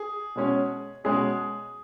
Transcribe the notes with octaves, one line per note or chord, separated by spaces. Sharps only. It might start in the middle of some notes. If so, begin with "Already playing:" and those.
Already playing: G#4
B2 G#3 C#4
B2 G#3 C#4 G#4